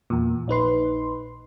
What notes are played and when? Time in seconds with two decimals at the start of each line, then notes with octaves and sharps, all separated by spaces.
0.10 E2 A#2
0.48 A#1 D#4 B4 C6